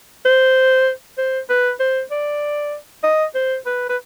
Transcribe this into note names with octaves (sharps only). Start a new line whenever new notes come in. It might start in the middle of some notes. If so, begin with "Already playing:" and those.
C5
C5
B4
C5
D5
D#5
C5
B4
B4